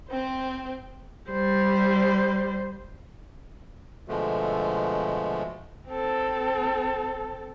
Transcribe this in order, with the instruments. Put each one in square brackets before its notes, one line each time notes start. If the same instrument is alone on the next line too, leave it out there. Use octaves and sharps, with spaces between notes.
[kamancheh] C4 C5
[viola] G3 C5
[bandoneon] B2 D3 F3 G#3 A3
[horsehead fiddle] C4 A4